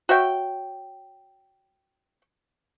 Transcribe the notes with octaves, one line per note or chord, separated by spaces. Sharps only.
F#4 C#5 E5 G5